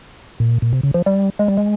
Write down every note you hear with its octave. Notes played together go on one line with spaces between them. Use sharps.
A#2
A#2
C3
C#3
F3
G3
G#3
G3
G#3